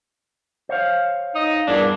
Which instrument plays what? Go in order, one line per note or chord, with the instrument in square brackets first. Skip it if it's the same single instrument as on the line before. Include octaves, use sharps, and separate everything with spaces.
[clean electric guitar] C5 C#5 F5
[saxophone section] D#4 D#5
[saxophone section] E2 A#2 D4 [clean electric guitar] G2